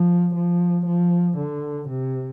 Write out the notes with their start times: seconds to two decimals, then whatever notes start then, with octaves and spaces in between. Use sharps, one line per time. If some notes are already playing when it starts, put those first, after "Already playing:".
Already playing: F3
0.35 F3
0.86 F3
1.38 D3
1.89 C3